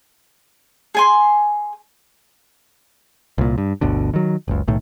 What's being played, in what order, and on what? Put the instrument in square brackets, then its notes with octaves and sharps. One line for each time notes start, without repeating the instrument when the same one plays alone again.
[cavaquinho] G#4 G#5 C6
[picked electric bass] C2 A#2
G2
G1 D2 B2 D3
D#3 F#3
F#1 C#2
B1 A2 D#3